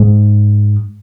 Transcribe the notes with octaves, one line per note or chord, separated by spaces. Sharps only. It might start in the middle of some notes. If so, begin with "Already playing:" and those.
Already playing: G#2